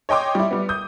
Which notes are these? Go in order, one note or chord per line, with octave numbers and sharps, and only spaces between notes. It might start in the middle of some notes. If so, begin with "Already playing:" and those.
C#5 D#5 G5 C6 D6
G3 E4
G3 B3
D#6 G6